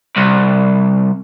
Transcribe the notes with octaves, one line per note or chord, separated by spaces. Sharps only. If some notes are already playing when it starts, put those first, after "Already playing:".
C2